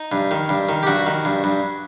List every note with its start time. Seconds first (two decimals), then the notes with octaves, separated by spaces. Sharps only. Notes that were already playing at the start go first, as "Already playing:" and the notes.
Already playing: D#4
0.12 G2
0.31 D#3
0.49 G2
0.69 D#3
0.83 G4
0.87 G2 F#4
1.06 D#3
1.25 G2
1.44 G2